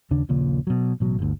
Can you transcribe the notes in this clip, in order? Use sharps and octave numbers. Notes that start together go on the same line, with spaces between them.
D#2 C#3 D4
D#1 A#1 A#2 C#3
B2 F#3
A1 B2 F#3
G1 D2